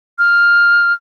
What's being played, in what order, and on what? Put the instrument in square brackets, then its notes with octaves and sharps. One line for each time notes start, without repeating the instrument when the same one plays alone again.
[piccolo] F6